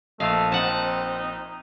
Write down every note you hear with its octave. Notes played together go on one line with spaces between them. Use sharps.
A#1 A3 A#3 D#5 F5
C4 D#4 F#5 A5